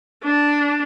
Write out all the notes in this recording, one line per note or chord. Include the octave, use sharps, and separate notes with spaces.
D4